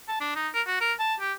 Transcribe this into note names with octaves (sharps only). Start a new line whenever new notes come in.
A5
D4
D#4
A#4
F#4
A#4
A5
G4